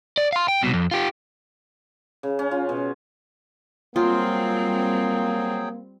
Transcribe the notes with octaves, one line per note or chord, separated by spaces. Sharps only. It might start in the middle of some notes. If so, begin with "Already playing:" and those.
D5
F5 C6
G5
C2 B2
F2
F4 G4
C#3
C#4
F4
B2
F#3 G3 A#3 C4 F4 G#4 G5